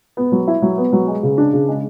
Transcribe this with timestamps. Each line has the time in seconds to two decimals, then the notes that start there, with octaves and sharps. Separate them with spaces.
0.17 B3
0.32 F#3
0.48 E4
0.62 F#3
0.78 B3
0.93 F#3
1.08 G#3
1.23 C#3
1.38 D4
1.53 C#3
1.68 G#3